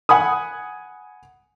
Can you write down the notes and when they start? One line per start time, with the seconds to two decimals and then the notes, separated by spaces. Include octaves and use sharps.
0.09 F#5 G#5 B5 D#6